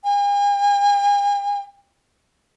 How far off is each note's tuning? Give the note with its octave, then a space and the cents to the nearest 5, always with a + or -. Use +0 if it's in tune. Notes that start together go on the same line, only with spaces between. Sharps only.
G#5 -45